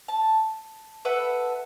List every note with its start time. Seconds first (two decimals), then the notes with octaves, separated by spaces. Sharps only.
0.08 A5
1.05 A4 B4 E5 F#5